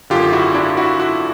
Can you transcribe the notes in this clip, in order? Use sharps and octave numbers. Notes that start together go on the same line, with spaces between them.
G#1 F#2 D3 F4 G4
E4 F#4
D4 E4
E4 F#4
E4 F#4